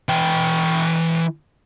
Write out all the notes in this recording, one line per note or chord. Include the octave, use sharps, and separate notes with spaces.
E3 G5